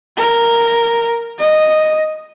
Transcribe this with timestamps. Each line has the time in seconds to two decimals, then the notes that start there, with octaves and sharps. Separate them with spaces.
0.17 A#4
1.39 D#5